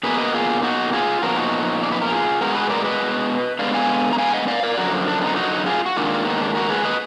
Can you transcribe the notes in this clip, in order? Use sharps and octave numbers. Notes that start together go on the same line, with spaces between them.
B2 A#3 G#4 B4
B4 D#5
F4 G#4
D#4 F#4
F4 G#4
A#2 F3 B3 F#4 A#4
D#4 F#4
D5
B4
A#4
F4 G#4
B2 G#3 B3 F#4 A#4
G#4 B4
A#4 D5
B4 D#5
D3 G#3 B3 D5 F5
F5 G#5
A#5
F5 G#5
D#5 F#5
D5 F5
A#4 D5
F#2 D3 F3 F#4 A#4
D4
B3 D#4
D#4 F#4
F4 G#4
F#4
G#2 D#3 A#3 D4 F4
B3 D#4
D4
F#4 A#4
G#4 B4
B4 D#5